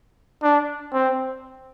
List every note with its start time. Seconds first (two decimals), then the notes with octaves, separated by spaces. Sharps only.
0.43 D4
0.93 C4